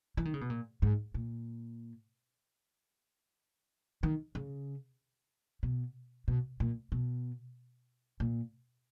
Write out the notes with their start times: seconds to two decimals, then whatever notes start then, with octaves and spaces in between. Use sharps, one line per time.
0.17 E3
0.25 D#3
0.34 C#3
0.41 B2
0.50 A#2
0.82 G#2
1.14 A#2
4.03 D#3
4.35 C#3
5.63 B2
6.28 B2
6.60 A#2
6.92 B2
8.20 A#2